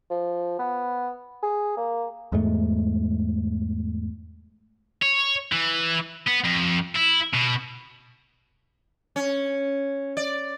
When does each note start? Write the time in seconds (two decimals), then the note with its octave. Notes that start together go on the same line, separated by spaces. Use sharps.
0.10 F3
0.59 B3
1.43 G#4
1.77 A#3
2.32 E2 G#2 G#3 A3
5.02 C#5
5.52 E3
6.27 B3
6.44 F2
6.96 E4
7.34 B2
9.16 C#4
10.17 D5